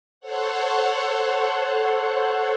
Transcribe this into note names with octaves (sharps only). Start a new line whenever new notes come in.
A4 C5 C#5 F#5